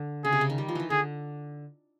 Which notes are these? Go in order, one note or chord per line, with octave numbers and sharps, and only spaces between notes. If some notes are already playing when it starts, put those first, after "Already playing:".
Already playing: D3
C#3 G#4
C3
C#3
D#3
G3
F3
D#3 E3
D3 G#4